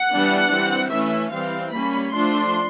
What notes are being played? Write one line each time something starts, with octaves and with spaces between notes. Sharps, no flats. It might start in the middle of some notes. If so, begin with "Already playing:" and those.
Already playing: F#5
E3 G3 B3 D4
E3 G3 C4
E3 A3 C#4 E5
E3 G3 C4 F5
G3 A#3 C#4 B5
F3 A3 D4 C6